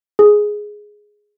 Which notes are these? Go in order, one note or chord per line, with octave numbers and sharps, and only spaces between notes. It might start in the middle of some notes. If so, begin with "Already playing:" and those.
G#4